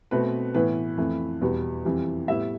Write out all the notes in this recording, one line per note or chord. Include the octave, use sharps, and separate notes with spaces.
B2 A3 C4 B4
A2 E3 B3 B4
F2 E3 A3
E2 B2 G3 B3
F2 E3 G3
A2 G3 B3 E5